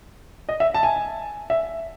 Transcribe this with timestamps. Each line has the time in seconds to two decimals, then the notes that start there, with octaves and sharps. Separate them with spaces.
0.49 D#5
0.60 E5
0.74 A5
0.83 G#5
1.50 E5